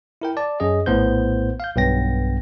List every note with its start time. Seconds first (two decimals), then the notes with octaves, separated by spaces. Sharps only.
0.22 E4 A#4 G5
0.37 D5 A5
0.60 F#2 C#4 G#4 D#5
0.86 A#1 A2 B3 C5 G6
1.60 F5 G6
1.76 B1 G2 B3 G5 A#6